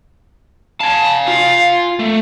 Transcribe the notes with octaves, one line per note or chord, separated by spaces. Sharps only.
F5 G#5 A5
F4
A3